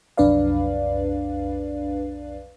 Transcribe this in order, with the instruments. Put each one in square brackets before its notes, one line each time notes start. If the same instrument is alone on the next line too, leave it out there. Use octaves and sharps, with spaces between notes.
[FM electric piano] B1 F2 D4 B4 D5 F5